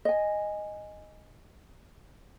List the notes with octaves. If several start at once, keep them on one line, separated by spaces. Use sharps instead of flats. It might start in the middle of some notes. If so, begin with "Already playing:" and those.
D#5 G#5